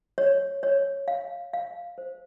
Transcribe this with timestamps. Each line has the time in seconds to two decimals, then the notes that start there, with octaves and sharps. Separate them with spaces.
0.18 C#5
0.63 C#5
1.08 F5
1.53 F5
1.98 C5